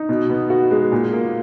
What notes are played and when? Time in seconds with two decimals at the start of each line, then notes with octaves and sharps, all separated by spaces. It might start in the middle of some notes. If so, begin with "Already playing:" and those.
Already playing: D#4
0.09 B2
0.30 B3
0.50 F#4
0.71 G#3
0.92 A#2
1.13 A#3